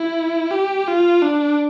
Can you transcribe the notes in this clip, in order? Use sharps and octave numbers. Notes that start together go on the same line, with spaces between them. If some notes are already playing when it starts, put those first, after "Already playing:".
Already playing: E4
G4
F4
D4